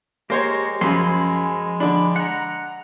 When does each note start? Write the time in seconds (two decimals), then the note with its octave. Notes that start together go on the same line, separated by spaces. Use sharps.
0.30 G#3 A#3 G4 C5 C#5 A#6
0.81 F#2 C#3 F3 G#5 B5 C6
1.80 D3 D4 B5
2.16 F#5 A#5